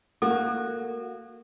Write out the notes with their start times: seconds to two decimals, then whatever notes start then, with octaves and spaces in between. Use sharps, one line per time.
0.22 A#3 F#4 A4